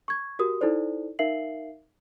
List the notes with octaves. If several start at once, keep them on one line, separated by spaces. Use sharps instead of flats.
C#6 G#6
F#4 G4 A#4 D#6
D#4 E4 A4 C5 D5
D#4 A#4 E5 F5 C7 F#7